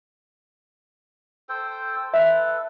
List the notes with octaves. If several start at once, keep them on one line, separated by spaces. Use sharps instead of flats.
A4 C5 G5
A4 B4 E5